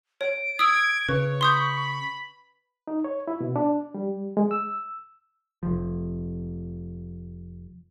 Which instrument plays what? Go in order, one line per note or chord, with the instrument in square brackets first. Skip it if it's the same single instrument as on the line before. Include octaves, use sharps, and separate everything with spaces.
[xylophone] C#5 [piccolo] D7
[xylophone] D#6 E6 [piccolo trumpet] G#6
[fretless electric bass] C#3 [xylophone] B4 [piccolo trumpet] C#5 [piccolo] C#6
[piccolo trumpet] B5 [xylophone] C6 D#6 G6
[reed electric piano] D#4
C#5
E4
B2
D4
G3
G#3
E6
[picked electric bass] F1 C2 F3